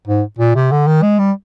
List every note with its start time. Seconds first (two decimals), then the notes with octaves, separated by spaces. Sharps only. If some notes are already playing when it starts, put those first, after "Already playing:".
0.07 G#2
0.39 A#2
0.55 C3
0.72 D3
0.87 D#3
1.02 G#3
1.19 G3